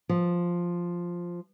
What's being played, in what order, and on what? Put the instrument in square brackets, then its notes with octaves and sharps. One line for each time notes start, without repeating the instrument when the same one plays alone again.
[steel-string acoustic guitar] F3